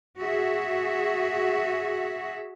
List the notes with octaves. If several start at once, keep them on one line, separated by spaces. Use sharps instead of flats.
F#4 G#4 E5